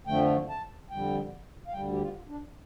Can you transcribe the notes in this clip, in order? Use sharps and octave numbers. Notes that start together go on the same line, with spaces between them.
F2 D3 F3 A3 G5
A5
F2 D3 G3 G5
F5
D2 D3 G3 G5
G4
F4
D4